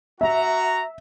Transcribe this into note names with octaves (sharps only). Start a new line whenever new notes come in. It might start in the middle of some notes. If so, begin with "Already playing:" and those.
F#4 E5 A#5